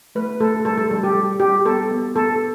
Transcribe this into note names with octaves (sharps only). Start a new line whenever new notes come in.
A3 B4
A3 A4
G3 A4
A4
G3 A4
G4
G3
G3 G4
B3 A4
B3
B3 A4